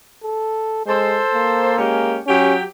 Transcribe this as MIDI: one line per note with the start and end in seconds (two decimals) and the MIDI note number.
0.23 0.81 69
0.86 1.21 56
0.86 1.72 69
0.86 1.72 72
1.34 2.19 58
1.76 2.16 56
1.76 2.16 61
1.76 2.16 67
2.26 2.60 54
2.26 2.54 61
2.26 2.60 67